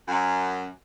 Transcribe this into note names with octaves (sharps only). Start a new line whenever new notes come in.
F#2